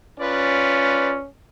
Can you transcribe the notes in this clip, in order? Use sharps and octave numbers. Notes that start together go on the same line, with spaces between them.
C#4 F4 B4 D5